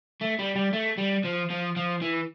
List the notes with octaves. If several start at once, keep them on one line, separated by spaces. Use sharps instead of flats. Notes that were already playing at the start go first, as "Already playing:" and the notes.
A3
G3
G3
A3
G3
F3
F3
F3
E3